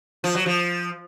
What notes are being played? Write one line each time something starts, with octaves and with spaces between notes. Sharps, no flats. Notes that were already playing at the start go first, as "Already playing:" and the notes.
F3
F#3
F3